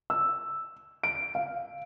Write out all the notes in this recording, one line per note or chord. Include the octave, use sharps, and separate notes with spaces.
E6
D7
F5